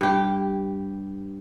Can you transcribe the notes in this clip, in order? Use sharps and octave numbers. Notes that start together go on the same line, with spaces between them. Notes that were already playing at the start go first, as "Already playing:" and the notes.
G2 G4